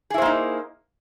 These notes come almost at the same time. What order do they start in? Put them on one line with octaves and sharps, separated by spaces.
G#4 E4 C5 A#3 D#4